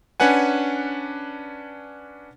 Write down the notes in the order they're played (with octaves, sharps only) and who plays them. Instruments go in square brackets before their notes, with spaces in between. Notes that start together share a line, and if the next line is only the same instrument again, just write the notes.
[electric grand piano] C#4 D4 B4 F#5 G#5